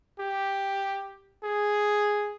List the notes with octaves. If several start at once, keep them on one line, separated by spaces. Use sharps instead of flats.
G4
G#4